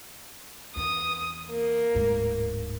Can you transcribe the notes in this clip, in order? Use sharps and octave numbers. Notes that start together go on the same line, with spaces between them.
E2 D4 D#6
A#3
D1 G#2